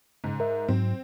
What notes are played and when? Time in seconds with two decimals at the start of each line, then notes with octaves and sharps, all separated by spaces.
0.24 G#2 C#3
0.40 A#4 E5
0.68 G#2 F#3 C4